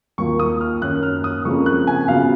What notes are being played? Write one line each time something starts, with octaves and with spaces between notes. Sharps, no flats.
D#2 D#3 A#3 F4 C#6
D#6
F6
F#2 D#3 A#3 C#4 F#6
F6
D#6
F2 C#3 F3 A#3 C#6
F#6
G#5
C#3 F#3 B3 F4 F5